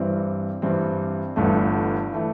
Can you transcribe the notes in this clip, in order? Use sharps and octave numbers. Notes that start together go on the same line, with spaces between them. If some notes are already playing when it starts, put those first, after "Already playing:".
Already playing: G2 E3 G3 C4
G2 E3 G3 C4
G1 G2 E3 A3
E3 A3